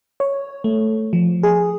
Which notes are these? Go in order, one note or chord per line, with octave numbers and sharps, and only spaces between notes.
C#5
A3
F3
G#4